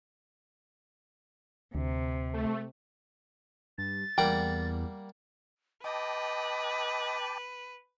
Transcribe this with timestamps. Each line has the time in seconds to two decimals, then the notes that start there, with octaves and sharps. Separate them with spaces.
1.75 D2 C3
2.34 A3
3.78 G2 A6
4.18 E2 G3 A#3 F#5 G5
5.84 B4 D#5 G5 A5 D6